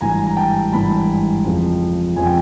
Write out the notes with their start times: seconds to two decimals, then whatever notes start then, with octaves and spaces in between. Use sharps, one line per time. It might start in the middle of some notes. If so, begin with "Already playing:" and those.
0.01 G#1 G2 E3 G#5 A#5
0.26 A#5
0.37 G5 A5
0.72 G#1 G2 E3 A5 B5
1.45 F2 C#3 F3
2.16 F2 C#3 F3 G#5
2.26 G5